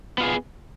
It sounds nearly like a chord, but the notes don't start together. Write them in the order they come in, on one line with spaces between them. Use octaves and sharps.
B3 F4 G#4